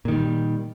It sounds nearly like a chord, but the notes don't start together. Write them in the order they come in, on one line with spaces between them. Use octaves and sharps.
A#2 D#3 G3